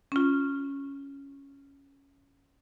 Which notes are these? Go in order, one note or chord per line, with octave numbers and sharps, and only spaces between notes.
C#4 F4